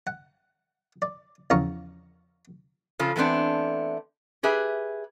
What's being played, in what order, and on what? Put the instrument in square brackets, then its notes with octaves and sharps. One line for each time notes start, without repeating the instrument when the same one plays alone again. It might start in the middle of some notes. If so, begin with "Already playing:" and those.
[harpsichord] F#5
D5
E2 C#3 F3 F5 A#5 C#6
[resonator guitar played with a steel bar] C#3 F3 F4 A4
E3 A3 B3 C4 D4
G4 G#4 B4 E5